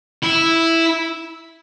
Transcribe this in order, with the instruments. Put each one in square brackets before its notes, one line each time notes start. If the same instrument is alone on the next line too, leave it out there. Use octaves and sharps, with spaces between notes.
[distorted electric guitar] E4